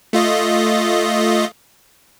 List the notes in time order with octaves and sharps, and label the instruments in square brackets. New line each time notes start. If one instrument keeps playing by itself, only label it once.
[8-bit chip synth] A3 F4 D#5